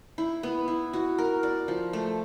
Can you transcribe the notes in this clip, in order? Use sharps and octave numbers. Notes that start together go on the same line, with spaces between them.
E4
B3
E4
F#4
A#4
D5
F3
A3